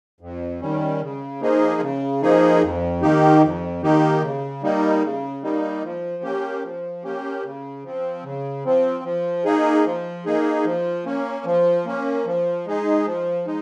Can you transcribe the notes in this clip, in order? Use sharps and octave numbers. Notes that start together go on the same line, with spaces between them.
F2
D#3 G3 C#4
C#3
F3 A#3 D#4 G#4
C#3
F3 A#3 D#4 G#4
F2
D#3 A#3 D#4 G4
F2
D#3 A#3 D#4 G4
C#3
G3 A#3 D#4
C#3
G3 A#3 D#4
F3
A#3 C#4 G4
F3
A#3 C#4 G4
C#3
F3 C4
C#3
F3 C4
F3
A#3 D#4 G#4
F3
A#3 D#4 G#4
F3
A#3 C#4
F3
A#3 C#4
F3
G#3 D#4 G#4
F3
G#3 D#4